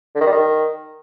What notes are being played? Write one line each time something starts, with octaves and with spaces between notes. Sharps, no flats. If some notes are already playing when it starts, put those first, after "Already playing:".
D3
D#3
G3
D#3